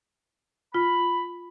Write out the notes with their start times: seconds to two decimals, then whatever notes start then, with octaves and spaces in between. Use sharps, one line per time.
0.74 F4 B5